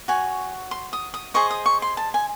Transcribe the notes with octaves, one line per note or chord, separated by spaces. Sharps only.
F#4 C#5 G#5
C6
D#6
D#6
G#4 C5 D#5 C#6
D#6
C#6
C6
A5
G#5